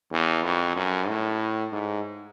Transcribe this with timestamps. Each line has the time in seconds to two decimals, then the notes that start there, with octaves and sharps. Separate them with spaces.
0.12 E2
0.44 F2
0.76 F#2
1.08 A2
1.72 G#2